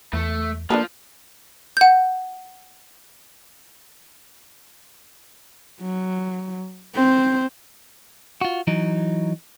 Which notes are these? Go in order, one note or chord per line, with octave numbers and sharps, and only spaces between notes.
E2 A3
F3 A#3 D4 A4 B4
F#5 G6
F#3
C4 C5
F4 F#4
E3 F#3 D#4